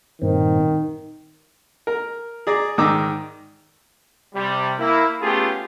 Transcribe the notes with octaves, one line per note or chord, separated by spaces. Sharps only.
G2 A#2 D#3 C4
A#4
G#4 D5 A#5
G#2 D#3 D5 A#5 D6 E6
C3 G3
A#3 E4
A3 B3 C#4 F4 G4 G#4